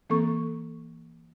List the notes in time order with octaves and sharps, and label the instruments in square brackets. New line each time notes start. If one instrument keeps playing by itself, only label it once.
[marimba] E3 A#3 C4 A4 C#6